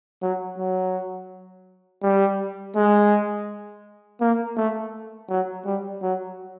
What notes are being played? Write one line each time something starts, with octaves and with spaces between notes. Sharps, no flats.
F#3
F#3
G3
G#3
A#3
A3
F#3
G3
F#3